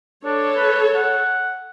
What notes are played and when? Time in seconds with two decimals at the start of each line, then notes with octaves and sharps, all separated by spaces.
0.25 D4 A4 C#5
0.56 B4
0.96 F#5